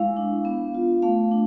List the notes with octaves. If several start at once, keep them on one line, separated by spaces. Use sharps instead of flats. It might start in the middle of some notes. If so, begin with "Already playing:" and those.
Already playing: G#3 E4 F5
D4
B3
F4
A3 F5
D4